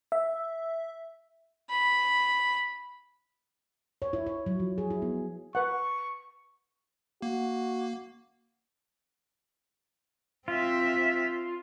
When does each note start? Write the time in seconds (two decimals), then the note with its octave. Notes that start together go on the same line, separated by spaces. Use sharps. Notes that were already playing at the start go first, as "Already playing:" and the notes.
0.12 E5
1.70 B5
4.02 C#5
4.13 E4
4.27 C#5
4.46 F#3
4.60 F3
4.78 G#4
4.90 E4
5.02 B3
5.55 B4 F#5 C#6
7.22 A#3 F#4
10.48 C4 F4 E5